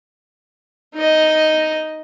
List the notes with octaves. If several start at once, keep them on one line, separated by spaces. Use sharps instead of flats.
D#4 D#5